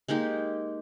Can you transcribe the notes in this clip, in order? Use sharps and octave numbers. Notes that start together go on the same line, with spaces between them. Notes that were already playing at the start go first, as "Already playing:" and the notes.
G#3 A#3 D#4 G4